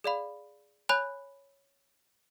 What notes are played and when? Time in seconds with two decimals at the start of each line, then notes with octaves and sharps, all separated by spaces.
0.04 G#4 D5 F5 B5
0.89 C#5 G#5 B5 F#6